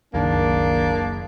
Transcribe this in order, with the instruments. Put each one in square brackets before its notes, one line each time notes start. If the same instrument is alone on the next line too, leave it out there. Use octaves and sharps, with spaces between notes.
[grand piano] F#1 [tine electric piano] C2 D#3 [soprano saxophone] A#3 [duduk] D4